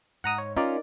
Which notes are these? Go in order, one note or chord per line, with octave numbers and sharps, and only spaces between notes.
G#2 F#5 A#5 D#6
C#5
C#4 D#4 F4 A#4 D5